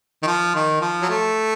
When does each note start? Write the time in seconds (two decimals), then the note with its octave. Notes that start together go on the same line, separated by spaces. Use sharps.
0.22 D#3
0.27 F3
0.55 D#3
0.81 F3
1.02 F#3
1.09 A3